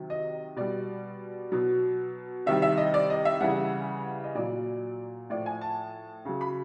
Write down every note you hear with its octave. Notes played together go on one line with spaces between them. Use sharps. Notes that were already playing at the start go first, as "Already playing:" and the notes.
Already playing: C3 D#3 F#3
D#5
B2 G3 D5
B2 F#3
C3 D#3 G3 E5
E5
D#5
D5
D#5
E5
C#3 E3 G3 F#5
D#5
A#2 F#3 D5
A2 F3 D5
G#5
A5
C#3 F#3
B5